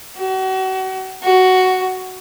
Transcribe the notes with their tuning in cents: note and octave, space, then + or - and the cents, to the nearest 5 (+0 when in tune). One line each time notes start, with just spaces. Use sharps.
F#4 +35
F#4 +5